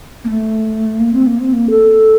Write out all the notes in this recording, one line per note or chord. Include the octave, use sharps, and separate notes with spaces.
A#3
A3
A#3
C4
A#3
C4
A#3
A4